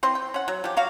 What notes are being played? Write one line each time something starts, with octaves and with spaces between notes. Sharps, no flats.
E3 C4 C6
G5
C#4 F#5
F#3
F3 G4
F#3 F#4 F5